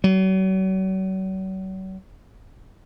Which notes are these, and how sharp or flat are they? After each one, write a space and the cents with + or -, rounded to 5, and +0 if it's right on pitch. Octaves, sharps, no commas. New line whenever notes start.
F#3 +40